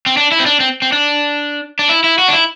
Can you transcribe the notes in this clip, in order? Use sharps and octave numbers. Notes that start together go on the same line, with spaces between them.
C4
D4
E4
C4
D4
C4
C4
D4
D4
E4
E4
F#4
D4
E4